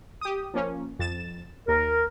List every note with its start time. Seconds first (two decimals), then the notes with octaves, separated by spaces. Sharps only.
0.21 G4 D#6
0.54 F3 A#3 C#4
0.99 F2 A6 E7
1.68 D#2 A#4